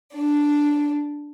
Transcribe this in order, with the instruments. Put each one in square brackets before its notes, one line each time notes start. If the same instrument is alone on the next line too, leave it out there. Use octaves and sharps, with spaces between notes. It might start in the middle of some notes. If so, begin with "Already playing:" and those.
[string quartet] D4